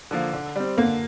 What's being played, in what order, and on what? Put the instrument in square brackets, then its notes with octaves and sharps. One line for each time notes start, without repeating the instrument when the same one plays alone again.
[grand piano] D3 F3 A#3
D3
G3 C4
[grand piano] D3 [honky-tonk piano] A#3